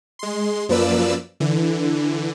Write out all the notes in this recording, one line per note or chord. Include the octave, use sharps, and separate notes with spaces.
G#3 C6
F#2 F3 A#3 B4 D5 E6
D3 E3